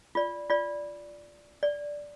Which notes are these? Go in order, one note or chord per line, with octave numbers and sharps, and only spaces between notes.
F4 D5
F4 D5
D5